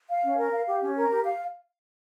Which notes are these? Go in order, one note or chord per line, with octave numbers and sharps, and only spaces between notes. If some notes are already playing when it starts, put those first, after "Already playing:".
F5
C#4
A#4
F5
G4
C#4
A#4
G4
F5